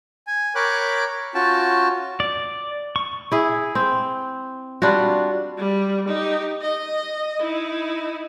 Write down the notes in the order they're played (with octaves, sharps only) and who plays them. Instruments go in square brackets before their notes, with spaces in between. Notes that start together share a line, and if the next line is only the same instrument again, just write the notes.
[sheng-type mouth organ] G#5
A#4 C#5 G5 B5 D6 F#6
C#4 F4 F#4 G5 A5
[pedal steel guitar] D5
C#6
[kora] E4 G#4
C4
G3 D4 F4 F#4
[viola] G3
D#4 G4
D#5
D#4 E4